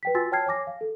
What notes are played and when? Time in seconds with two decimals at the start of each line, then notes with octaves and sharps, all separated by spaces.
0.03 B4 G5 B6
0.14 F4 F#4 G#5 C6 E6 A6
0.32 C#5 G5 A5 F6 G#6 C7
0.46 C#5 G#5 D6 A#6
0.67 F5
0.81 A4